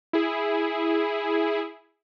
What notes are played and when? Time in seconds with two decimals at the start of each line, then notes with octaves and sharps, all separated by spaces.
0.13 E4 G#4